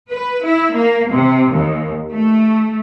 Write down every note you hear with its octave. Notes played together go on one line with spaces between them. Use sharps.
B4
E4
A#3
C3
D#2
A3